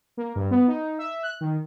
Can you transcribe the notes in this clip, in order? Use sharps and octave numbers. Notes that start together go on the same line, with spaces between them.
A#3
G2
B3
D#4
E5
F#6
D#3